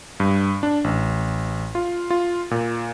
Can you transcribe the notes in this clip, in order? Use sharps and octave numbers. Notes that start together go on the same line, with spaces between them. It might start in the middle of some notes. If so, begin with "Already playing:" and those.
G2
D4
A1
F4
F4
A#2